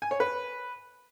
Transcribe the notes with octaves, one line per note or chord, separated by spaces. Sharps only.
G#5
C#5
B4